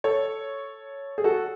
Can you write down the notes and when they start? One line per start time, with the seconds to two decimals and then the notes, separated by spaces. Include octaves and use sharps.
0.04 A4 C#5
1.18 G#4
1.24 F#4 A4